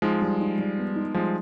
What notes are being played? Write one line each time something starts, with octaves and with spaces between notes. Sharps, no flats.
F3 G#3 D#4
G3
D#4
G3
B3
D#4
F3 G3 G#3